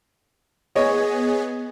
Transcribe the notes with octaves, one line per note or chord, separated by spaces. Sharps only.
B3 G#4 C#5 D#5